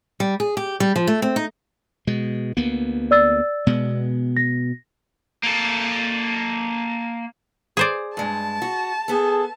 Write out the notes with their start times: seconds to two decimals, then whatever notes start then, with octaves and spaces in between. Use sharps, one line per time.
0.20 G3
0.40 G#4
0.57 G4
0.80 G3
0.96 F3
1.07 A3
1.22 C4
1.36 D#4
2.07 B2 G#3
2.57 D2 A#3 B3
3.11 D5 E6 A6
3.67 B2 G#3 B3
4.37 A#6
5.43 A#3 A4
7.77 G#4 C5 D5
8.17 G2 G#3 A5
8.62 F#4
9.08 B3 G#4 A4